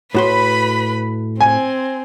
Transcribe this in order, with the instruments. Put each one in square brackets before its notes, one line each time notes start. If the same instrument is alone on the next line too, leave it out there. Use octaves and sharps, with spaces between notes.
[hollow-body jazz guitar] A2 F#4 C6 [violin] B4 B5
[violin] C4 [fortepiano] G#5